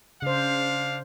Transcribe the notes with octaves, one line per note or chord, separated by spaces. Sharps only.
C#3 D4 C5 F5